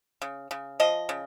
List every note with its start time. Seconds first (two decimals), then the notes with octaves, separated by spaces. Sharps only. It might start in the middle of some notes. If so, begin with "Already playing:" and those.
0.22 C#3
0.51 C#3
0.80 F3 D#5
1.09 C#3